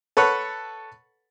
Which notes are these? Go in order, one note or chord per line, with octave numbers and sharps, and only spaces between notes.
A4 B4 C#5 F#5